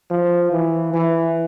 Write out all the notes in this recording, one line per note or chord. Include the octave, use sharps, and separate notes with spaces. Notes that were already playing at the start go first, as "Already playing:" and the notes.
F3
E3
E3